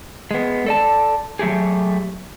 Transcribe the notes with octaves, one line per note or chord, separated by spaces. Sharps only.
G#3 B3
A4 D5 A5
F#3 A3 G4 G#4